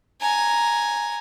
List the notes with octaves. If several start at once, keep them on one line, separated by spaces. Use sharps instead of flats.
G#5 A#5